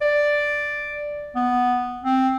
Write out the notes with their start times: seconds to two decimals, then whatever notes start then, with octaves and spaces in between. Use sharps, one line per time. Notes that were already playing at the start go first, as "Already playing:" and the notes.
0.01 D5
1.36 B3
2.04 C4